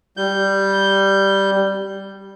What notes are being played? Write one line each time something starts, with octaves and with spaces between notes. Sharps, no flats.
G3 G6